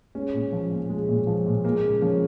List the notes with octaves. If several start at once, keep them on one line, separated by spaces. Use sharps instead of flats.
G#3 C#4
A#2
F3
A#2
G#3
A#2
F3
A#2
G#3 A#3
C#3
F3 C#4